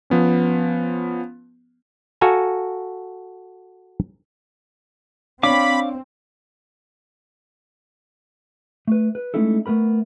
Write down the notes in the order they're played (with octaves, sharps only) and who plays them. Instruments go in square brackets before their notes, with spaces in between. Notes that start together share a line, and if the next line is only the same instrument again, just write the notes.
[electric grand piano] F3 B3 C#4
[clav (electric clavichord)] F#4 A4 F5 G#5 A#5
[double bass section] C4 [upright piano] D4 C#5 [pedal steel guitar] F5 D6 [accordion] B5
[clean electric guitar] A3 B4
B4
G#3 A3 C#4 D#4 E4 A4
A3 B3 A#4 B5